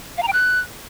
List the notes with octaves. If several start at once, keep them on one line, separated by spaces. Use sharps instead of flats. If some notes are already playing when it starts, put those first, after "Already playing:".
F5
A#5
G5
F#6